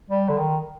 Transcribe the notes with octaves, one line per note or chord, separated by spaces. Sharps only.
G3
D3
D#3